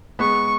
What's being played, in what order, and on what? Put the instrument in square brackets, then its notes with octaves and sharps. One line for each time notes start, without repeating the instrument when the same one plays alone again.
[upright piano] G#3 B3 [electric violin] C#6